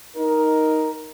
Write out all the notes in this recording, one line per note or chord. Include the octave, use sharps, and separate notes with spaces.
D#4 A#4